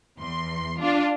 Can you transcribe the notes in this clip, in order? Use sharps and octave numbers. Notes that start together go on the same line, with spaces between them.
E2 C6
D4 F4